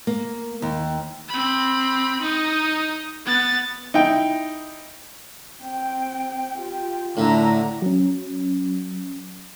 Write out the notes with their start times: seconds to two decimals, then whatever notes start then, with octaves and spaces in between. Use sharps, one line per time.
0.07 A#3
0.62 D#2
1.29 C4 B5
2.22 D#4 D#5
3.26 B3 A6
3.94 D#4 E4 G5
5.61 C4 G5
6.58 F4 G4
7.17 A2 D3 E5 A#5
7.82 F#3 C#4